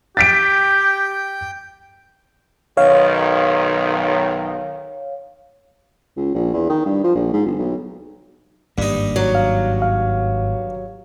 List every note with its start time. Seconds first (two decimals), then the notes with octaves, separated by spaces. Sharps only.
0.17 G4 G5 A6 B6 D7
2.77 B1 D#3 C#5 F5
6.16 C#2
6.34 A#1
6.53 E2
6.69 D#3
6.86 G2
7.04 F3
7.15 A#1
7.33 G#2
7.46 G1
7.58 B1
8.78 G#1 G2 A#3 D#4
9.16 F#3
9.35 F5
9.82 F5